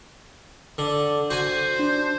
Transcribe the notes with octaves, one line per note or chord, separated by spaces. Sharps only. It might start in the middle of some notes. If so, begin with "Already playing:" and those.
D3
F#4 C5 G#5
D4